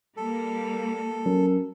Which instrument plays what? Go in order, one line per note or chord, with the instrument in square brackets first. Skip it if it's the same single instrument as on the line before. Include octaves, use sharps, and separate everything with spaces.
[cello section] G3 A#3 [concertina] A4
[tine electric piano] F#3 C#4 A#4